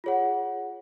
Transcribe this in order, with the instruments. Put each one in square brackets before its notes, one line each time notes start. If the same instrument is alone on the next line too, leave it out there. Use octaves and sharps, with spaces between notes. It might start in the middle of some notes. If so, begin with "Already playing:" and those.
[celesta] F4 G#4 C#5 F#5